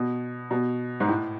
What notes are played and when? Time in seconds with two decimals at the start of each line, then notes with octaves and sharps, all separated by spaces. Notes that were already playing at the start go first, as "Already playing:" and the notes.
Already playing: B2
0.51 B2
1.00 G#2
1.08 A2